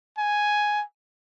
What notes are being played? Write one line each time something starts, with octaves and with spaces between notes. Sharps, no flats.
G#5